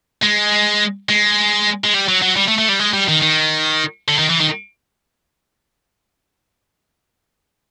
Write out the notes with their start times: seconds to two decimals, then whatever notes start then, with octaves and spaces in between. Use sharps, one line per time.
0.23 G#3
1.09 G#3
1.84 G#3
1.94 G3
2.08 F#3
2.22 F#3
2.36 G3
2.48 A3
2.58 A3
2.69 G3
2.79 G#3
2.93 G3
3.08 D#3
3.22 D#3
4.08 D3
4.18 D#3
4.30 E3
4.40 D#3